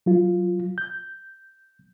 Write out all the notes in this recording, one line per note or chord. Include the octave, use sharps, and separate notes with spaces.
F#3 F4
G6